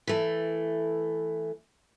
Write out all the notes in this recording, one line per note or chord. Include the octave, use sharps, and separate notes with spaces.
E3 A3